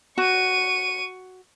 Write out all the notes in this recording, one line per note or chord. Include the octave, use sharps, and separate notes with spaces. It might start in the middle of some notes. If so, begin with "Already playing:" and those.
F#4 C#6 D#7